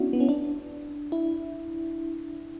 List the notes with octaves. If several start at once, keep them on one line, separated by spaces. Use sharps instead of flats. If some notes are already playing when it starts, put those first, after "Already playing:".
Already playing: B3 C#4 D4 E4 F#4
B3
C#4
D4
E4